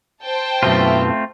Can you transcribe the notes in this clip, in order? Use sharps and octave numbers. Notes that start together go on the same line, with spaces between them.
C5 G5 A5
F#2 B2 A3 C4 E4 F4 B4 E5